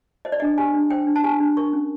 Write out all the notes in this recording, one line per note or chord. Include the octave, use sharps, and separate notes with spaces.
C5 D#5
D5
D4 D#5
G4 G#5
D4
C5 G5
D4
A5
G4 G#5
D4
A#4 C#6
C#4